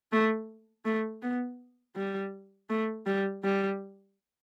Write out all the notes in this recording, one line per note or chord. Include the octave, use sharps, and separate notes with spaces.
A3
A3
B3
G3
A3
G3
G3